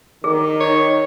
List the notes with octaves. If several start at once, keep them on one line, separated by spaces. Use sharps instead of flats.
D#3 G#4
D#4 C#5